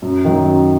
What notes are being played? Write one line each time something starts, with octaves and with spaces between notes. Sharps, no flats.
F#2
D#3 F#3
F#2